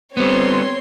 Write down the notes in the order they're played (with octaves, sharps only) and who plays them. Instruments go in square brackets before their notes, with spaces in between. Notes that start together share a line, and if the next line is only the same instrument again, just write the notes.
[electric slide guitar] G3 B3 [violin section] C4 C#5 C6